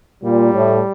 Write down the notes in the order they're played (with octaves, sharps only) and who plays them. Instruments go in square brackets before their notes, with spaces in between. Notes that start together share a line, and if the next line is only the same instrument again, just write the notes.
[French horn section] A#2 [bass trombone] G3
[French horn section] A2